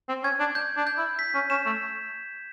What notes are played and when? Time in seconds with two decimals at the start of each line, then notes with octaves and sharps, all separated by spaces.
0.09 C4
0.23 C#4 G#6
0.39 D4
0.55 G6
0.76 D4
0.87 G6
0.98 E4
1.19 B6
1.34 C#4
1.50 C#4 E7
1.66 A3